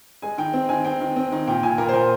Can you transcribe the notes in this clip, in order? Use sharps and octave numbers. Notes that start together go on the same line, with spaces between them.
G#3 G#5
D#3 G5
C4
D#3 G#5
C4 G5
D#3
C4
D#3
A#2 G5
A#2 G#5
A#2 A#4
C5
A#2 A#4